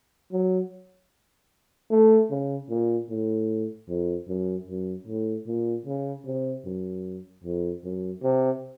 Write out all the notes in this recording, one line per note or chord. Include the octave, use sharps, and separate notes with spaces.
F#3
A3
C#3
A#2
A2
F2
F#2
F#2
A2
A#2
C#3
C3
F#2
F2
F#2
C3